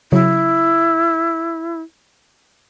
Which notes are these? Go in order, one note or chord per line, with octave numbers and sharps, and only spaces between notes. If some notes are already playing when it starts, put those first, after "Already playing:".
C#3 F#3 E4